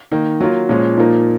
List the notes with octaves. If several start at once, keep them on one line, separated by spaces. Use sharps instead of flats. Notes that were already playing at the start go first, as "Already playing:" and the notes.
D#3 A#3 D#4
F#3 A#3 F4
A#2 F3 G#3 C#4
A#2 F3 A#3 D#4